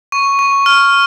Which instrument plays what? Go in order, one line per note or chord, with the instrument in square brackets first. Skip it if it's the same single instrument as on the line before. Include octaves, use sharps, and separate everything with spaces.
[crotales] C#6
C#6
F6